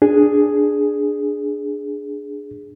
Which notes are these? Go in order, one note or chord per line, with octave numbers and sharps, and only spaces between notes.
D4 G#4